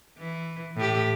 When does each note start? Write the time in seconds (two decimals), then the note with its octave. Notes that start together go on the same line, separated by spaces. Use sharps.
0.18 E3
0.77 A2 G4